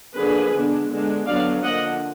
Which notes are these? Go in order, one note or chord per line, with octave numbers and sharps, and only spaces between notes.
D3 F3 A#3 D4 G#4 B4
D3 G#3 B3 D4
D3 G#3 B3 D4
D3 F#3 B3 D4 D5 F5
D3 F3 A#3 D4 D#5 F#5